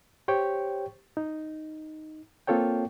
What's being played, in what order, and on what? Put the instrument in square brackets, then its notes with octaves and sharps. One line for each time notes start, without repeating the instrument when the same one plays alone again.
[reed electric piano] G4 C5 C#5 G5 C#6
D#4
A#3 C4 F4 A4 C#5 G5